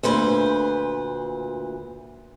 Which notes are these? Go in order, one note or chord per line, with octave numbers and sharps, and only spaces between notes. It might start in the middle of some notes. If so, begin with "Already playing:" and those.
D2 A#2 B4 C5